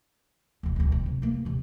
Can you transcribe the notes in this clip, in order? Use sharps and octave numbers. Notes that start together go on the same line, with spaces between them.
D#1 B2
D1 B1
D3
C3
A#3 B3
D1 C3